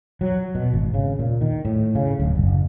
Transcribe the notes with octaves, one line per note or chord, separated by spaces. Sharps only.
F#3
B2
G#1
C#3
A#2
D#3
A2
C#3
D1
F#1